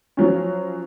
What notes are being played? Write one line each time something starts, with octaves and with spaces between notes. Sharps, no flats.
F3 F#3 C#4